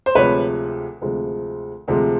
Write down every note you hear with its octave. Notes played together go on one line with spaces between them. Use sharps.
C5
D2 C3 F3 G#3 B4 C#5
D2 C3 F3 G#3
D2 C3 F3 G#3